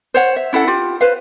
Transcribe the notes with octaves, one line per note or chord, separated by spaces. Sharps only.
C5 C#5 F#5
E5
C#4 E4 A4 F#5
F4 G4
B4 C5 F5